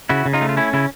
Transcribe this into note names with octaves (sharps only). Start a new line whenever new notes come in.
C#3 E4 F#4
C#3
D#4 F4
A3
F4
C#4 E4
C#3 E4